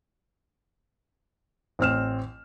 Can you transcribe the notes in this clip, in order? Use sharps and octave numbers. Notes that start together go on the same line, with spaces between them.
A1 C4 F6 E7